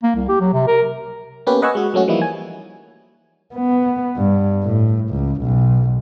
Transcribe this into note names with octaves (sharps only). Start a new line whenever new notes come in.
A#3
C2
G4
F#3
C3
A#4
A#3 B3 C#4 G4 B4
B4 D#5 F#5 G#5 C#6 E6
G#3 F#4
F#3 A3 C#4 F#4
E3 F3 G3 A#3 D#4 E4
G#5
B3
G2
A2
C#2
B1